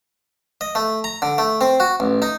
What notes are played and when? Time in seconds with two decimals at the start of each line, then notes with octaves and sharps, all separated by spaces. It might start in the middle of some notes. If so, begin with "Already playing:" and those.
0.61 D#5
0.75 A3
1.04 A#5
1.22 D3
1.38 A3
1.61 C4
1.80 F#4
2.00 A1
2.22 D#4